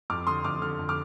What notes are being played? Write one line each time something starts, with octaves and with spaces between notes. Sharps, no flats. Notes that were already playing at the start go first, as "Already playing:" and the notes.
F2 D6 F6
D3 C6 D#6
F2 D6 F6
D3 F6
F2
D6 F6